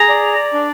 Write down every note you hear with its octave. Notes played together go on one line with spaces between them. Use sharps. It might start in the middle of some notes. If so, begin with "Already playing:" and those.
Already playing: G#4 A#5
D5
D4